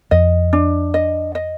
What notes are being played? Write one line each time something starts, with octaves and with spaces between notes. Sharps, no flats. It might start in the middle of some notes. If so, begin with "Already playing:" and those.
F2 D#5
D4
D#5
D#5